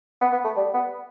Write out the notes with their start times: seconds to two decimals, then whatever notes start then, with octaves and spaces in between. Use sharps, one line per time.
0.21 B3
0.32 B3
0.44 A3
0.56 G3
0.74 B3